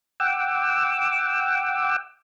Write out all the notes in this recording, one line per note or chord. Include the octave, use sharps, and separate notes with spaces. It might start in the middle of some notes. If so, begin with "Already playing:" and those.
F#5 G5 D6 E6